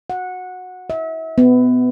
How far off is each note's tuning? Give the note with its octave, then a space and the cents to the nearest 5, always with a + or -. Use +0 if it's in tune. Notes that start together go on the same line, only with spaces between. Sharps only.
F#5 -15
E5 -35
B3 +20